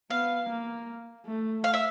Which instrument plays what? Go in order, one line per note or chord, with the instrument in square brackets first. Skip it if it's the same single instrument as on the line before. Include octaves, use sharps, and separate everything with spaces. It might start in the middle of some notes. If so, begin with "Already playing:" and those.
[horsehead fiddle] B3 [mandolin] F5
[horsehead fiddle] A#3
A3
[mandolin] F5
E5